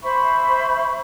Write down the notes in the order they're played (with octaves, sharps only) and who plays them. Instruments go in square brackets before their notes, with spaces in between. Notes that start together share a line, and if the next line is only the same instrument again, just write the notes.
[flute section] C5 E5 B5 C#6